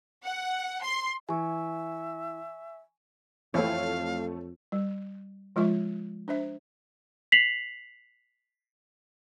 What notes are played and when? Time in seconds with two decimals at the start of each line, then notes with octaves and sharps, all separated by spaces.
0.25 F#5
0.83 C6
1.29 E3 E5 G#5 C#6
3.54 F2 E3 A3 C4 E4 C#5 F5
4.72 G3
5.56 F3 G#3 F4 E5
6.28 D4 C5 E5
7.32 B6 C7 F7 F#7